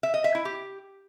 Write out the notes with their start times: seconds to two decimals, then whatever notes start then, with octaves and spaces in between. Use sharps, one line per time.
0.03 E5
0.14 D#5
0.24 E5
0.35 E4
0.45 G4